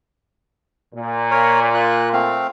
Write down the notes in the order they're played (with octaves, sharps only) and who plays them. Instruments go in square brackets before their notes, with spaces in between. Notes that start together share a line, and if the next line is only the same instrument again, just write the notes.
[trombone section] A#2
[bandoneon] A#4 C#5
F4 F#6
A3 C4 F5